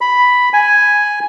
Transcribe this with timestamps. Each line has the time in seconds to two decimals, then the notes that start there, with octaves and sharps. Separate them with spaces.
0.01 B5
0.53 G#5